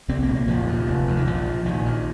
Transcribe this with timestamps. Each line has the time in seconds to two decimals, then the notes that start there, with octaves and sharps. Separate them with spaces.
0.09 C2 C4
0.23 A#3
0.29 A#2
0.36 A#3
0.48 F1 F3
0.68 D#2
0.88 F1
1.07 D#2
1.17 D#3
1.27 A#1 F3
1.46 A#2
1.65 A#1 D#3
1.85 A#2